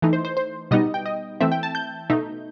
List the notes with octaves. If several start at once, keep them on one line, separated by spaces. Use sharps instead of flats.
E3 A3 D#4
C5
C5
C5
B2 G3 B3 D#4 D#5
G5
D#5
E3 A3 C4 E5
G5
A5
G6
B2 A3 D#4